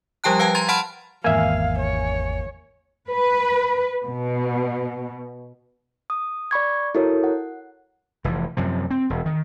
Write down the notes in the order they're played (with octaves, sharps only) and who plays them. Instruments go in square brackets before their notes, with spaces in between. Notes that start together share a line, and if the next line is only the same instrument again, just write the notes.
[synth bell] F3 G3 G4 G5 A5 F#6
B4 F5 G5 A5 G#6
A#5 C6 G#6 A6
F#5 A5 B5 C6 F6 D7
[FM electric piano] G#1 E2 G#5 [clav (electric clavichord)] A#3 E5 [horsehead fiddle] F5
[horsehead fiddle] C#5
[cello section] B4
B2
[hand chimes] D#6
D5 B5 C#6 G#6
E4 F#4 A4 A#4 C#5
F#5
[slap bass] F1 E3
F#2 C3 F3
C4
E1
D#3